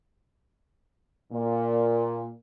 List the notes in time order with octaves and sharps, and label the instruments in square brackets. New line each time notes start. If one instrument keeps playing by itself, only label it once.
[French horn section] A#2